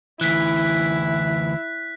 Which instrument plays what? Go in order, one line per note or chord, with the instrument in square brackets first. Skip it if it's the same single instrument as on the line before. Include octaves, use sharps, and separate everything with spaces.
[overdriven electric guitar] D2 E3 [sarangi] E4 [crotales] F#6 B6